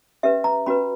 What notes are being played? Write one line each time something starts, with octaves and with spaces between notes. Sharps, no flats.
C#4 G4 B4 E5
A#5
C#4 F#4 B4 B5